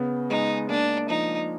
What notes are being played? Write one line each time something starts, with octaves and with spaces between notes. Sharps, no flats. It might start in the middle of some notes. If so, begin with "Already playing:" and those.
Already playing: C#3 B3
G#3 D#4
A#3 D4
F3 D#4